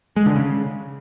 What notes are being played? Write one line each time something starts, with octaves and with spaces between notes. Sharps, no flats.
G#3
D3
C#3